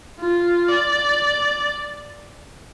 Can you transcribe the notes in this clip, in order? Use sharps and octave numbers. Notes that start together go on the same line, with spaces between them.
F4
D5